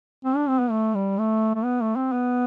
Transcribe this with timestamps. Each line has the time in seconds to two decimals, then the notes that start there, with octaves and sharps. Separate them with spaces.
0.25 C4
0.36 D4
0.49 C4
0.60 B3
0.71 A3
0.95 G3
1.18 A3
1.55 A3
1.65 B3
1.81 A3
1.96 C4
2.13 B3